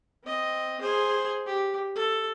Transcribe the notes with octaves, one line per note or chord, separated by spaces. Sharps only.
C4 D#5
G#4 C5
G4
A4